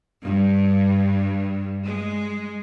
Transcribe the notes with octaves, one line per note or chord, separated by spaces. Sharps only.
G2
G#3